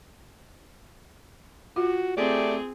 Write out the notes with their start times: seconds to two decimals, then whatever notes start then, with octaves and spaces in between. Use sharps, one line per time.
1.76 F4 F#4
2.17 A3 C4 G4 G#4 D5